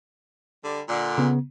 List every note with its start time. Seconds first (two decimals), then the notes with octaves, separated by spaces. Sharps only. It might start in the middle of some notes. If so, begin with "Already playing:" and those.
0.63 D3 G3
0.87 A#2 D3
1.18 C#3 B3